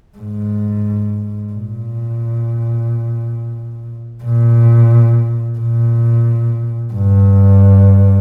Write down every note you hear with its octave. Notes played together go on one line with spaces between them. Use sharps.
G#2
A#2
A#2
A#2
G2